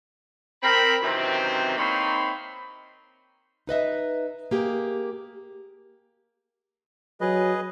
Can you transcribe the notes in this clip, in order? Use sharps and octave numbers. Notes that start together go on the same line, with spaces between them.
C4 A#4 B5
F#2 C3 D#3 E3 C4
A#3 C4 D#4 C#5 B5 C6
D#4 B4 D#5 E5
A#3 G4 G#4
F#3 G#4 B4 D#5